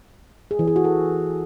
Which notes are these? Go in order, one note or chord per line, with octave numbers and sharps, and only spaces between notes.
G#4
E3
G#4
F#4
A4